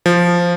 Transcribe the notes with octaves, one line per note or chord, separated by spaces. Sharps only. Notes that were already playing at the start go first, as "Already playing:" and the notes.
F3